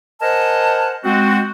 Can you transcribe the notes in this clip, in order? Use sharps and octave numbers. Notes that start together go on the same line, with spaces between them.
A#4 C5 D#5 F#5 G#5 A5
G#3 C4 F#4